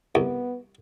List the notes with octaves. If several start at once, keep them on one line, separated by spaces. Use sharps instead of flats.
C2 B3